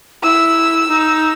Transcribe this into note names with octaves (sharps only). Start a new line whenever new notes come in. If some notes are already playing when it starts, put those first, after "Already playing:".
E4 E6
D#4